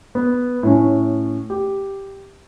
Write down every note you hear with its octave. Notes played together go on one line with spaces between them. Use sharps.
B3
A2 C#4
G4